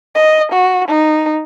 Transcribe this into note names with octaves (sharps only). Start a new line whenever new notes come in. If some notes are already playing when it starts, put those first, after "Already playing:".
D#5
F#4
D#4